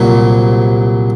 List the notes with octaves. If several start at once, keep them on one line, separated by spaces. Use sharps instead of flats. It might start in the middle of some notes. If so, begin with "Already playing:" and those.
Already playing: C2 A#2 F#3